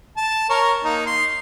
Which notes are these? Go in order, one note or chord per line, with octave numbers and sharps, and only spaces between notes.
A5
A#4 C#5
A#3 D#4
C6